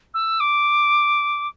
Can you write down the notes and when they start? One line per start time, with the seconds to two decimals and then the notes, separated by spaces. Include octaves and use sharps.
0.14 E6
0.40 D6